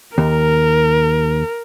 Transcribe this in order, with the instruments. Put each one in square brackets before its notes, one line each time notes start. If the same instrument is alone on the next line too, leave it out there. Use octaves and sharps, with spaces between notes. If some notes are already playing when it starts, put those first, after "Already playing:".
[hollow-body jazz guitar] D#2 [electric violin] A#4